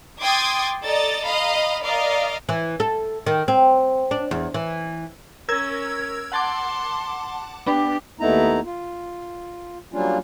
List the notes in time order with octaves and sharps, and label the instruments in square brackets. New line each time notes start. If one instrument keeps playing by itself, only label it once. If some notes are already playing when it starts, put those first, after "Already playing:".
[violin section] G5 C6 D6 D#6 G#6 A6
A4 D5 D#5 A#5 A6
D#5 F5 A#5 B5
A#4 D5 D#5 F5
[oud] E3
A4
D#3
C4
D4
E2
E3
[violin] C#4 [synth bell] A#4 E6 G#6
[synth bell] F#5 A5 D6 [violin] C6
[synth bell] B3 D4 [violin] G4
[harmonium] D#2 A3 B3 D#4 E4 A#5
F4
F#3 G3 A#3 C#4 D4 F4